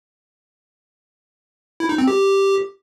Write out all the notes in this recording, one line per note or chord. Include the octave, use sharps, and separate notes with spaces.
E4
D#4
C4
G4